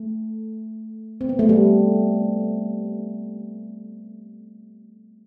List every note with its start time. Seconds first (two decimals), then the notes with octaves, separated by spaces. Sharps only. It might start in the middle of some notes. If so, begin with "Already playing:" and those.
Already playing: A3
1.21 C4
1.29 B3
1.39 A3
1.49 G3